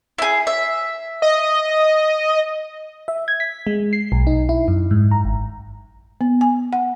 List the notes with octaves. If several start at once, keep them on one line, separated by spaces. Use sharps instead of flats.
E4 G#4
E5
D#5
E5
G#6
B6
G#3
C7
B1
D#4
E4
F#2
G#2
A#5
G#1
B3
G#5
F#5